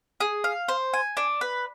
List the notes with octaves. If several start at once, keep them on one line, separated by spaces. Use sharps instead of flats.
G#4
F5
C5
G#5
D4
B4